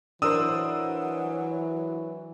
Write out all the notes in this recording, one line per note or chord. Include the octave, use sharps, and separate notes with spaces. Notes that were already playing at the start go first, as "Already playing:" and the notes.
E3 F#3 D4 A#4 C5 D#6 E6